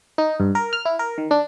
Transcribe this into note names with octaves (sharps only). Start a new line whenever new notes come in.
D#4
G2
A#4
F6
E4
A#4
D#3
D4